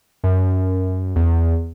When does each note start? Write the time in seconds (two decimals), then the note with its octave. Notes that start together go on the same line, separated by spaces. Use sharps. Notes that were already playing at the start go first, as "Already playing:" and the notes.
0.24 F#2
1.16 E2